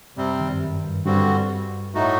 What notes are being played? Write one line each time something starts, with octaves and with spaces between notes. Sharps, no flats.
F#2 C3 G3 C4
D#3
G2
F#2
G2
G2 D3 G3 C4 F#4
A2 A3 D#4 F#4